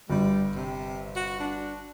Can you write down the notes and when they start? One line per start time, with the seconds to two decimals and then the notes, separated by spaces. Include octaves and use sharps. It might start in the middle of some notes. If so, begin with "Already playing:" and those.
0.10 G1 G3
0.55 C3
1.16 F#4
1.40 D4